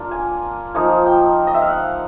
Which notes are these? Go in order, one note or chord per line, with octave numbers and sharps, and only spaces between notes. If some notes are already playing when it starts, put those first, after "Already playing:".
Already playing: A#3 D4 F4
G#5
F3 A#3 D#4 G#5
G5
D#5
E5
F5
F#5